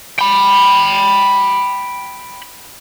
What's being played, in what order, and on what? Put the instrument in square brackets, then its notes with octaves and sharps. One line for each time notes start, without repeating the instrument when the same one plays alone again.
[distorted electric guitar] G5 B5